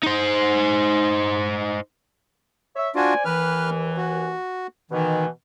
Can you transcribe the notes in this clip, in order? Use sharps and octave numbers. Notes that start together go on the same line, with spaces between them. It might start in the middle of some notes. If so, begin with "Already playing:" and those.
D#4 C5
C#5 E5
D4 F4 F#4 C5 D5 G#5
D#2 E3 B4 F6
F#4
B2 D#3 E3